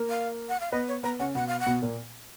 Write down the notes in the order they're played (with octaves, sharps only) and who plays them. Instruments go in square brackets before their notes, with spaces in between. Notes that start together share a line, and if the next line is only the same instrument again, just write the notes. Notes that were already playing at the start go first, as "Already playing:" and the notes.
Already playing: [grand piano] A#3 A#4
[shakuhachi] F5
F#5
F5
[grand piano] B3 B4 [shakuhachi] D#5
[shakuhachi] C#5
[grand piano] B3 B4 [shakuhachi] A#5
[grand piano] C#3 C#4 [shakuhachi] F#5
[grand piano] B2 B3 [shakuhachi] F#5
[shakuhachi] F5
F#5
[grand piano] B2 B3
A#2 A#3